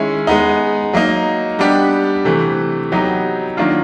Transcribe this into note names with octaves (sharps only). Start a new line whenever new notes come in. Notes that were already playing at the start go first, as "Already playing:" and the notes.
Already playing: D#3 G#3 C#4 E4
G#3 B3 D#4
F#3 A#3 D#4
G3 B3 D4 G4
C3 E3 A3
F#3 B3 D#4 G4
D#3 F#3 A#3 D4 F4